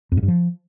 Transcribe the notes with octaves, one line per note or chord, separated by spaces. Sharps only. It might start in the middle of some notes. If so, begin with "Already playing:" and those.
F2
G#2
G2
F3